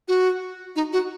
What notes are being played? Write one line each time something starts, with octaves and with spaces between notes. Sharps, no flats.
F#4
D#4
F#4